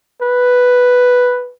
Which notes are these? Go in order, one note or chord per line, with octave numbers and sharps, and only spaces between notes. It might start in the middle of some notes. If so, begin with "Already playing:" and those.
B4